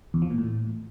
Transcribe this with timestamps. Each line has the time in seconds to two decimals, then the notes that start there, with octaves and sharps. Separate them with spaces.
0.14 E2
0.22 F3
0.30 A#2
0.38 A2